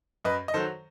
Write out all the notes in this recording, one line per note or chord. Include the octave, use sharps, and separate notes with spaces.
F#2 B4 D#5
D#5
D#3 F#3 A4 C5